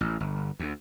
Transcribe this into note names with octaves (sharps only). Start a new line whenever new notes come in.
A1
G1
D2